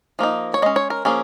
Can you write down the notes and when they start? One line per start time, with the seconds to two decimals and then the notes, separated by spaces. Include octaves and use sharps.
0.19 F3 A#3 D#4
0.54 C#5
0.62 G#3 C#4 D#5
0.76 C#5
0.90 A#4
1.05 F3 A#3 C#4 G#4